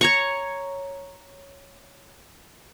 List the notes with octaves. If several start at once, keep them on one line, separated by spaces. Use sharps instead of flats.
C#5 A#5 C#6